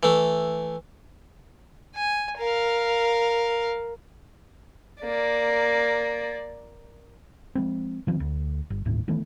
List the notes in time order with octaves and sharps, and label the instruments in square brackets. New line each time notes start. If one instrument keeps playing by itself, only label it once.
[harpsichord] E3 A3
[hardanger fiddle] G#5
A#4 F5
A#3 D5
[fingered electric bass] F3 G#3 C4
D#3 F3 C4
D2
G1
G1 D#2 A2
D#3 E3 A3 B3